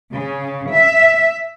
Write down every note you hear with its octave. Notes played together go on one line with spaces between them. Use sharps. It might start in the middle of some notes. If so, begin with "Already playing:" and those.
C#3
E5